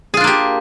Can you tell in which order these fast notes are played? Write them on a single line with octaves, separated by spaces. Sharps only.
G#4 F4 D4 A#3 G4